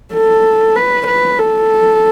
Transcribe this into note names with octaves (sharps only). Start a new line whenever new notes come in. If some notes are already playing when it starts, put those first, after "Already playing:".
A4
B4
B4
A4